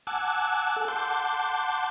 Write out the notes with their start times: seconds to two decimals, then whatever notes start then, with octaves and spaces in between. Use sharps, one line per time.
0.07 F#5 G#5 A5 D6 E6 F#6
0.76 A4
0.88 F#5 A5 C6 D6 G6